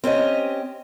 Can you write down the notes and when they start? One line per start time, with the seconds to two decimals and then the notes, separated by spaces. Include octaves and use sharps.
0.04 C4 C#4 G4 D#5